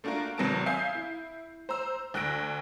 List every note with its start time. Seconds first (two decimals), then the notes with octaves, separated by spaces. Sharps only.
0.04 A3 A#3 D4 F4 F#4 A#4
0.38 G#1 C3 F#3 B3 A5 D7
0.66 E5 F5 G#5 D#6 G6 C7
0.95 E4
1.69 C5 A#5 E6
2.14 D2 F#6 A#6 D7